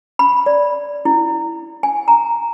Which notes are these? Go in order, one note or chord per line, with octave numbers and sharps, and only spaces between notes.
B5
D5
E4
G#5
A#5